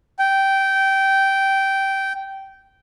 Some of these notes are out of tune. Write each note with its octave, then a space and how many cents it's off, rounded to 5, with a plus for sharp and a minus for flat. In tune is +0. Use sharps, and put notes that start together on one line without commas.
G5 -15